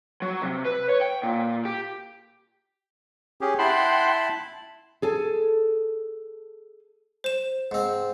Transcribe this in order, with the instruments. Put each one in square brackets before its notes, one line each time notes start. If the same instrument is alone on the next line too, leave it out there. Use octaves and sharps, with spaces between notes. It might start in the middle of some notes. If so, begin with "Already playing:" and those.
[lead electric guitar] F#3
C3
B4
C#5
G5
A#2
G4
[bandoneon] C#4 G4 G#4
[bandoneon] E4 A5 B5 [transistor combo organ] F#5 G5 C6
[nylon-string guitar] G#4 A4 G#5
[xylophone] C5 E7
[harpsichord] G#2 C4